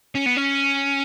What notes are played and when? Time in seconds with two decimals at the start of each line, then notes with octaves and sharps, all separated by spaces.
0.15 C#4
0.26 B3
0.37 C#4